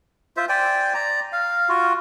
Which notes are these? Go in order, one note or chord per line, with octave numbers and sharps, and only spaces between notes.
F4 C5 E5
C5 D5 G5 G#5
D5 A#5
F5
F4 F#4